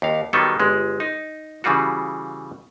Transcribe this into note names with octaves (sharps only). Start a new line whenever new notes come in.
D#2 F5
D#3 F#3 G3 B3 D#4 A4
G1 G#3
D#4
C#3 E3 G3 F4 F#4